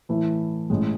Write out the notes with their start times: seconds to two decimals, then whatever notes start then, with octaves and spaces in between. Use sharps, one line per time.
0.09 A2 E3 A3 E4
0.70 A1 A2 G#3